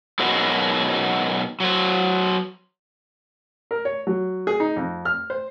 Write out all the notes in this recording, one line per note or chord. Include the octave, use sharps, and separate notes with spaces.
B2 D#3 F#3 G#3
F#3 C5
A#4
C#5
F#3
G#4
D#4
F2
F6
C5